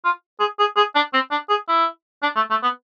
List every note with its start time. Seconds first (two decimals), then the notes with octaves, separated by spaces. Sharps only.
0.04 F4
0.40 G#4
0.59 G#4
0.77 G#4
0.95 D4
1.13 C4
1.31 D4
1.49 G#4
1.68 E4
2.22 D4
2.36 A3
2.50 A3
2.63 B3